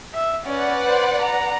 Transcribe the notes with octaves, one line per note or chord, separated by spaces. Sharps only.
E5
C#4 B4 D5 F#5
C5
A#5